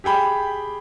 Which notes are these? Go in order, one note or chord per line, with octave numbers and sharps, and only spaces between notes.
G4 G#4 G5 B5